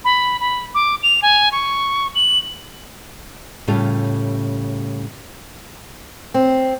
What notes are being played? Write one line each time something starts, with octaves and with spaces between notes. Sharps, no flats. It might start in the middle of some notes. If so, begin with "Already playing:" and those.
B5
B5
D6
F7
G#5
C#6
F#7
A2 C#3 G3 C#4 F4 A4
C4